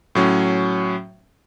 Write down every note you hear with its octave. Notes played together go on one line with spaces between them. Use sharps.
A2 F#3 C#4